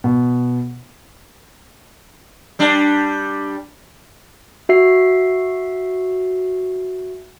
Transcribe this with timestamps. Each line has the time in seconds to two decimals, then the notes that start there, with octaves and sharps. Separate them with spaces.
0.04 B2
2.59 G3 D4
4.69 F#4 E5 C7